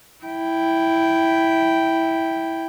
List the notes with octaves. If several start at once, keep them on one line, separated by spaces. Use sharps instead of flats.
E4 G5